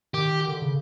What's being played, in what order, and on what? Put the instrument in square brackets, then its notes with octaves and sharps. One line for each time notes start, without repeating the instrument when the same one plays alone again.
[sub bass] D#3 [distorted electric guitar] G4
[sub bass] D3
C#3